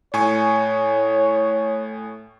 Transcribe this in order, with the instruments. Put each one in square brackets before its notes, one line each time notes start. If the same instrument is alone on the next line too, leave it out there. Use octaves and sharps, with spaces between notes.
[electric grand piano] A2 G#5 C#6 [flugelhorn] C#5